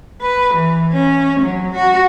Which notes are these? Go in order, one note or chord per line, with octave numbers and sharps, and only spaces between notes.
B4
E3
C#4
F#3
F#4